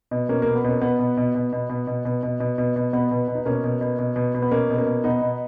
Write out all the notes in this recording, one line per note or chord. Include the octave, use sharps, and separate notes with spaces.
B2
B2 A#3 C#4
B2 A#3
B3
B2 A#3 C#4
B2 B3
B2
B2
B2
B2
B2
B2
B2
B2
B2
B2
B2
B2 B3
B2
B2
D#4
B2 A#3 C#4
B2
B2
B2
B2
B2
B3
B2 A#3 C#4
B2
A#3 C#4
B2
B2 B3 D#4
B2